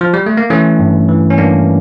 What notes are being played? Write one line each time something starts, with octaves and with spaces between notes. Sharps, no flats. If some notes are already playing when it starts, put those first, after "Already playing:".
F3
G3
A3
A#3
E3 A3 C#4
G2
E3
C#4
G2 A#3 D4